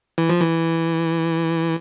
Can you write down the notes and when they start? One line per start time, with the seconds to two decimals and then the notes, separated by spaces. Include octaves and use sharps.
0.18 E3
0.29 F3
0.41 E3